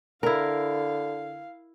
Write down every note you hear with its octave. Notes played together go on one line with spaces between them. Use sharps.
D3 E4 A#4 F5